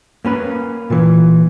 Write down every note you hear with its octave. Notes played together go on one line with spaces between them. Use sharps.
A#3 C#4 B4
A#2 E3